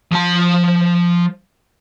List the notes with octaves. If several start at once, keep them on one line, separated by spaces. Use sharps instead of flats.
F3 A5